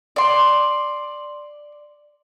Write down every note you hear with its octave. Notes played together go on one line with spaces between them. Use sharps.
D5 C6